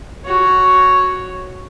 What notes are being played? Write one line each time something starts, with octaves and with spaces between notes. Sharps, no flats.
F#4 C#5